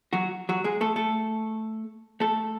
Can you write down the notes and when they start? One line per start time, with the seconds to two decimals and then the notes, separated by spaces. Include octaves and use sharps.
0.13 F#3 F#4
0.49 F#3 F#4
0.64 G#3 G#4
0.81 A3 A4
0.96 A3 A4
2.20 A3 A4